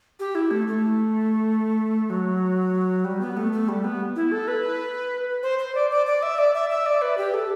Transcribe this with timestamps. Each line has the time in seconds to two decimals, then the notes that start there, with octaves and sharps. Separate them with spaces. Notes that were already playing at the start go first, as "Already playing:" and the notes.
0.20 G4
0.35 E4
0.51 A3
0.67 A3
2.10 F#3
3.05 G3
3.21 B3
3.37 A3
3.53 A3
3.68 G3
3.84 B3
4.16 E4
4.32 A4
4.48 B4
5.43 C5
5.59 C5
5.75 D5
5.90 D5
6.07 D5
6.23 E5
6.38 D5
6.54 E5
6.70 E5
6.86 D5
7.02 B4
7.18 G4
7.34 A4